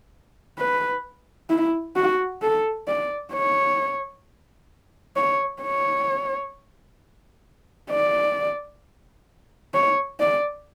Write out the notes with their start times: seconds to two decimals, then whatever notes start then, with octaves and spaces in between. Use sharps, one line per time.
0.58 B4
1.50 E4
1.96 F#4
2.42 A4
2.88 D5
3.33 C#5
5.16 C#5
5.62 C#5
7.91 D5
9.74 C#5
10.20 D5